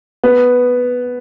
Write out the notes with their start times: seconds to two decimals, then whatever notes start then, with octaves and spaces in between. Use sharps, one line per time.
0.24 B3